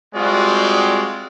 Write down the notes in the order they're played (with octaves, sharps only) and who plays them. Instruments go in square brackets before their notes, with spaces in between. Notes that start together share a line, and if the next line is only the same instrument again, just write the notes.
[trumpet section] G3 G#3 C4 F4 F#4 D5